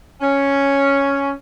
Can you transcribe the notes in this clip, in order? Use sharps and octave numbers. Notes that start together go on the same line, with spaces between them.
C#4